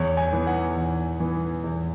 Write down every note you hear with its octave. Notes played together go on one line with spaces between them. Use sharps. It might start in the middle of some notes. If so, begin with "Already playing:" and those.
Already playing: E2 C#5
G#5
E3 B3
F#5
E2
E3 B3
E2